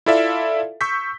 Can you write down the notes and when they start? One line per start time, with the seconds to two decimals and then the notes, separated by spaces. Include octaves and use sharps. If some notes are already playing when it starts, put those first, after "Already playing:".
0.06 E4 F4 A4 D5 E5 F5
0.81 C#6 E6 G6 B6